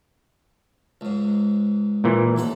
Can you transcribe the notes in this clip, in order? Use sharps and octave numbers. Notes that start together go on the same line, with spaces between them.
C#2 G#2
A#2 E3
D#2 A4 F#5